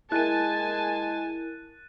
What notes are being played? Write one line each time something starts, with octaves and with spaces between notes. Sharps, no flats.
G#3 E4 A#4 G#5 A5 F#6 A6 D#7